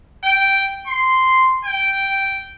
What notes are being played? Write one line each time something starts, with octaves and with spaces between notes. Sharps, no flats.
G5
C6
G5